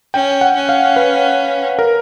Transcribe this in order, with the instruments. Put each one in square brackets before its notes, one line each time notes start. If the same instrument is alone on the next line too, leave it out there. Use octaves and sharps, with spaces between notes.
[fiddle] C#4 [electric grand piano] G5
[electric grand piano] F#5
[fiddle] C#4
[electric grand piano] F5
B4
A#4